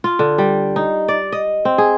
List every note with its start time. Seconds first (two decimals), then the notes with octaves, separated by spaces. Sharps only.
0.04 F4
0.19 D3
0.38 G3
0.76 D#4
1.08 D5
1.32 D#5
1.65 C4
1.78 G#4